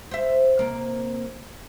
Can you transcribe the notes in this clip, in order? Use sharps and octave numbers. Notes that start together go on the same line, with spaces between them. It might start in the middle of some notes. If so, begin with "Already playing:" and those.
C5 E5
C3 A#3